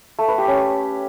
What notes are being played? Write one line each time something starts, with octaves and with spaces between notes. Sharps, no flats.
A3
B4
G4
C#4